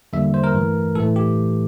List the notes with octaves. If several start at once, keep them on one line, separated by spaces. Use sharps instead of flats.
E2 D3 G3 A#3 E5
C5
A#4
G2 E3 A3
A2 E3 A3 A4
G4